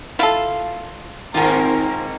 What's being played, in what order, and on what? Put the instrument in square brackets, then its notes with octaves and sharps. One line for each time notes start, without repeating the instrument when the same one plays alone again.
[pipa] E4 A4 [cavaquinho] F4 F5
[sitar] G#2 D#3 A#3 [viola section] C4 A#4 [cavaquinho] F4 G#5